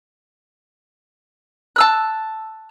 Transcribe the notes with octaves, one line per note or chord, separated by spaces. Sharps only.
A5 E6 F#6